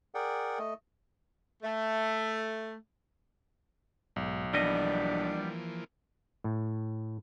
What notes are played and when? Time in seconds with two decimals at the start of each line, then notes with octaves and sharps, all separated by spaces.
0.15 G#4 A#4 D5 F#5 G5
0.59 A3 D#5
1.63 A3
4.16 B1 G#2
4.54 E3 F3 G3 A#3 B3 D4 D#5
6.44 A2